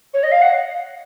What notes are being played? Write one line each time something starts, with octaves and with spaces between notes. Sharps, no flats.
C#5
D#5
F5
F#5